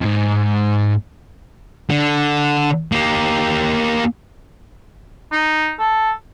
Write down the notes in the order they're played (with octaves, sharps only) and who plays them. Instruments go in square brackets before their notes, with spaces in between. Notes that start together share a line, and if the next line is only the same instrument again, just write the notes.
[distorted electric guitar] F2 G#2
D3
A#3 G4
[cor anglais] D#4
A4